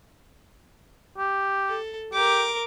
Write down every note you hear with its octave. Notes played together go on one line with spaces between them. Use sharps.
G4
A4
G4 A#4 D6